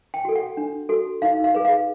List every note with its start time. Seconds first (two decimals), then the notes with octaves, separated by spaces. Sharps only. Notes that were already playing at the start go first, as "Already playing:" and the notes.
0.14 G5
0.25 F#4 A4
0.36 F#5
0.57 D4
0.89 F#4 A4
1.22 D#4 F5
1.44 F5
1.55 G#4 B4
1.65 F5